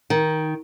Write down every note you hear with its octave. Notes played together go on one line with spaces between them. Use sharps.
D#3